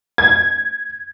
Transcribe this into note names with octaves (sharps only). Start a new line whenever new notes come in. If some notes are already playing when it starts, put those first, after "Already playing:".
G#6